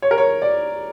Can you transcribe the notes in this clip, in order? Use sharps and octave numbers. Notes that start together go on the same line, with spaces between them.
C#5
A#4
C#5
D5